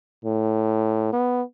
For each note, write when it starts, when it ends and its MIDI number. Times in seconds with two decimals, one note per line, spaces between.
0.25 1.09 45
1.13 1.42 59